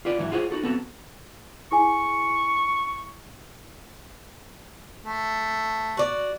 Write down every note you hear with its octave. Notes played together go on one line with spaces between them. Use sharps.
F4 G4 B4 D5
G#2 E3 F#3 E4
F4 G4 G#4 C5 C#5 F#5
D#4 F#4 A4
B3 C4 F#4 A4
E4 G#4 G#5 C#6
A3
F#4 D5